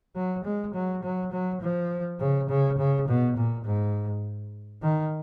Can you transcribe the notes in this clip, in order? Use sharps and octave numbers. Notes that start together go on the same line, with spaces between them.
F#3
G#3
F#3
F#3
F#3
F3
C#3
C#3
C#3
B2
A#2
G#2
D#3